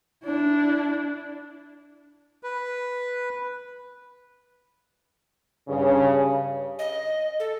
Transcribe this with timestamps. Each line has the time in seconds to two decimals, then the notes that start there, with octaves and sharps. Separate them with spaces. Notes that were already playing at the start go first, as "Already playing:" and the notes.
0.24 D4 E4
2.43 B4
5.68 G2 C#3
6.79 D#5
7.40 A4